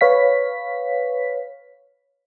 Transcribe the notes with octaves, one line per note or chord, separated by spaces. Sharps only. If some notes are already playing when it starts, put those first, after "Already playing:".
B4 C#5 F5 B6